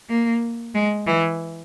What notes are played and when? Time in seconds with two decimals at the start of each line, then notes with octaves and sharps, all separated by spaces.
0.09 A#3
0.74 G#3
1.07 E3